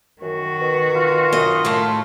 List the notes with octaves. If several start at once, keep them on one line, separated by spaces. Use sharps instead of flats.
F#2 D#3 F#4
B2
F4
F#2 D#5
A2 A3